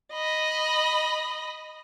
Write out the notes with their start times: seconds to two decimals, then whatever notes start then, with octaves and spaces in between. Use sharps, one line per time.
0.13 D#5 B5